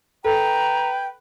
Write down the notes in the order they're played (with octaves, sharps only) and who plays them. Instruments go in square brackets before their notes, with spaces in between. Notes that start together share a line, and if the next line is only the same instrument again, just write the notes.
[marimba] A4 [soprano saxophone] B4 [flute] G5 [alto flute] A#5